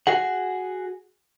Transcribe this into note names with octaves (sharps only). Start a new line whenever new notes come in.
F#4 G#4 F#5